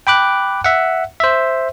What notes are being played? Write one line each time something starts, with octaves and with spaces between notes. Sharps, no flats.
G5 B5 D6 F#6
E5 F#5
C5 E5